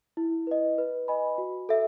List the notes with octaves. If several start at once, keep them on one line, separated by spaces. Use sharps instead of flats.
E4
B4 D#5
B4
D#5 G#5 B5
F#4
A4 E5